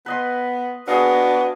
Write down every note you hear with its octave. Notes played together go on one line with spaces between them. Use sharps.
B3 B4 D#5 C6
B3 D4 F#4 G#4 D#5 F5